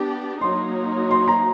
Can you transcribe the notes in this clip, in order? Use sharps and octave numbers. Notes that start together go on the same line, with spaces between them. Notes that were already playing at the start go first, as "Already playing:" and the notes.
Already playing: B3 D4 G4
F#3 A#3 D#4 C6
C6
A#5